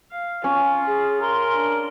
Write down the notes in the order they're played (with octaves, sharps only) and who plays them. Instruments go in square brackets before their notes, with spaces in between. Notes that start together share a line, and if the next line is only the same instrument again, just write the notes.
[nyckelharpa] F5
[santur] C#4 [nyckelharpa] F4
[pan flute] G#4
[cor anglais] A#4 [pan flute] C6
[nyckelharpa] D4